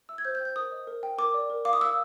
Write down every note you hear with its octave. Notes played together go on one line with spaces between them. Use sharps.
E5 E6
G#6
C5 G6
G6
G5
G6
A#4 D#6
D#5
A#4
G5
A#4 D6
D5
A#4
F5 D6
D#6
F5 E6